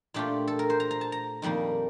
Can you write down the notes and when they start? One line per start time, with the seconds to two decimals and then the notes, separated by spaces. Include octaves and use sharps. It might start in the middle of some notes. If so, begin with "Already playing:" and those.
0.14 A#2 A3 D4 F4 G4
0.47 A4
0.59 A#4
0.70 C5
0.80 A#5
0.91 A#5
1.01 A5
1.12 A#5
1.42 F2 D#3 G3 A#3 D#4